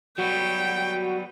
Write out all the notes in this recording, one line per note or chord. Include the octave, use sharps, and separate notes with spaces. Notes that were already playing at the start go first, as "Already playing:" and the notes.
F#3 G3 B3 F#4 G5